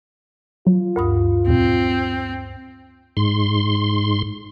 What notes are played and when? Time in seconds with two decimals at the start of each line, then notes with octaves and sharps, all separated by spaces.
0.67 F#3 F4
0.96 D2 G2 A#4 D#6
1.48 E2 A#2 C4
3.17 G#2 C6